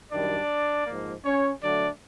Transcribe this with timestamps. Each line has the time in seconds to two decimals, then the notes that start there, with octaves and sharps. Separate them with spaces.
0.12 F#2 D#3 G3 D4 D5
0.86 G#2 F3 A#3
1.24 C#4 C#5
1.61 D3 F#3 A3 D4 D5